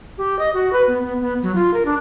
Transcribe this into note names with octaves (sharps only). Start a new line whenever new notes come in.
G4
D#5
F#4
B4
B3
B3
B3
F#3
F4
A#4
D4